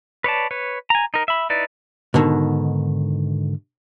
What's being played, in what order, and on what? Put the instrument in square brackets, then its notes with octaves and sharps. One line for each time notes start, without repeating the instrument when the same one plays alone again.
[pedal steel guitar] B4 C#5 D5 A5
B4 C#5
G#5 A#5
D#4 A#4
E5 B5
D#4 E4 B4 D5
[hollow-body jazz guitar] G#2 B2 D3 D#3